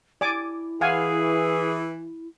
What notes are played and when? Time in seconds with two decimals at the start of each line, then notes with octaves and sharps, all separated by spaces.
0.21 E4 D5 G#5 D6
0.81 E3 G#4 F5 F#5 G#5